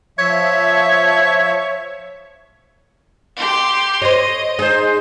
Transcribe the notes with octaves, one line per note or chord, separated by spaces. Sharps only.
F3 C#5 E5
G4 C6
C5 C#5 D#5
D#4 G#4 C5